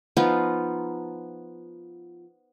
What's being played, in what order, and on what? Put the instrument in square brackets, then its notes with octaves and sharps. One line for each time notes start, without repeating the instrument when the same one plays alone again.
[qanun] F3 B3 D#4 F4